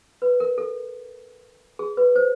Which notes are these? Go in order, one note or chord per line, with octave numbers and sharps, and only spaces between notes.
B4
A#4
A4
G#4
B4
C5